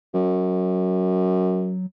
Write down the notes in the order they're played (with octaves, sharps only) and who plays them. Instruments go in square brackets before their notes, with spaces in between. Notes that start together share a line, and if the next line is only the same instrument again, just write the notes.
[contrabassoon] F#2 [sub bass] F#3